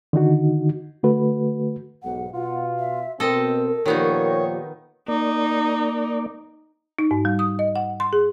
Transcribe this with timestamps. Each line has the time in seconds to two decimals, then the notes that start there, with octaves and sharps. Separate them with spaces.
0.13 D3 D#3 D#4 F#4
1.04 D3 A3 F#4 B4
2.03 B1 G#2 F#5
2.34 B2 F4 F#5
2.79 E5
3.20 B2 C4 A4 A#4 D#5
3.86 A#2 D#3 F3 B3 D#4 G4 C#5
5.08 A#3 D#4 D5
6.99 D#4
7.11 G#2
7.25 G3
7.39 D#6
7.59 D#5
7.76 F#5
8.00 C6
8.13 G#4